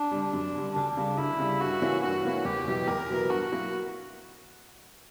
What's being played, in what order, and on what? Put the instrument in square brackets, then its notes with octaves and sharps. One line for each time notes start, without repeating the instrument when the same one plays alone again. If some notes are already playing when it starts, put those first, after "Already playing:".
Already playing: [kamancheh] D4
[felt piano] D3 G3
F#2
D3 G3
[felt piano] D2 [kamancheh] D4
[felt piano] C#3 G3
[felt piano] D2 [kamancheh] E4
[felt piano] C#3 G3
[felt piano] G2 [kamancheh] F#4
[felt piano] E3 A#3 C#4 E4
[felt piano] G2 [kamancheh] F#4
[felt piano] E3 A#3 C#4 E4
[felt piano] E2 [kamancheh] G4
[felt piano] B2 F#3 B3 E4
[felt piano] E2 [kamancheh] A#4
[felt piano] B2 F#3 B3 E4
[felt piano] G2 [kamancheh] F#4
[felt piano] F#3 A#3 E4